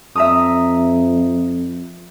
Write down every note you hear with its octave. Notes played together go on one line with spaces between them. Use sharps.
F2 E5 A#5 D#6